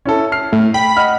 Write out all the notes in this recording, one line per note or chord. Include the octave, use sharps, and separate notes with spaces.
C#4 E4 A4
F6 C7
A2
G5 B5
D#5 F#5 F6